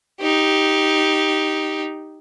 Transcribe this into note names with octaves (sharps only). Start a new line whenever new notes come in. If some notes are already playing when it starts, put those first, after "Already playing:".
D#4 G4